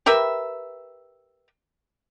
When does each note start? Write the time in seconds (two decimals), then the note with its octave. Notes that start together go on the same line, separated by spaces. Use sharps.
0.06 G4 A#4 B4 E5